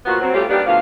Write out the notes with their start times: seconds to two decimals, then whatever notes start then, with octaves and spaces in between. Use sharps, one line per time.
0.06 A#2 F3 B3 F#4
0.21 F#3 C4
0.34 G3 A3 C#4 F4 G4
0.49 G3 A#3 B3 D4 D#4 G4
0.66 D2 F3 A#3 B3 F5